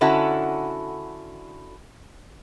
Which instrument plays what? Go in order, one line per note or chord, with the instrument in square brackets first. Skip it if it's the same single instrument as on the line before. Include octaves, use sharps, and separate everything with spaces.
[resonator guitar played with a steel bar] D3 C#4 E4 F#4 A4